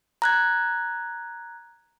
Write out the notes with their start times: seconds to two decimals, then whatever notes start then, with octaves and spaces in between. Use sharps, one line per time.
0.22 A#5 F#6 G#6